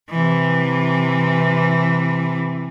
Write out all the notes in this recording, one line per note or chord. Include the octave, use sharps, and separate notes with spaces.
C3 E3